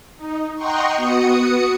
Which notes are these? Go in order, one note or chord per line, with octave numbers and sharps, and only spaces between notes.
D#4
D#5 F#5 G5 A#5 C6 C#6
B3 F#4 D#6 C#7